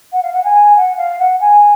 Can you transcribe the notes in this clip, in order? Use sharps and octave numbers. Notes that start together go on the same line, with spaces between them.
F#5
F5
F#5
G#5
F#5
F5
F#5
G#5